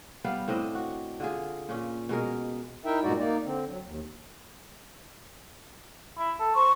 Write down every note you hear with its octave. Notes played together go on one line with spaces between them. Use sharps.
G3 B3 F5
A2 C4 D4 D#5
F#4
D3 F4 G#4
A#2 C#4
B2 G#3 G#4 A#4
D#4 E4 A#4 E5 G5
G2 A#2 G#3 D#4 F#4 D5
A#3 D#4 D5
D3 C4
F#3
D#2
E4
A4
C5 C#6